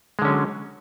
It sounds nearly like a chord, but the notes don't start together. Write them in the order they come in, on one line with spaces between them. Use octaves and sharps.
G#3 D3 C#4 F#3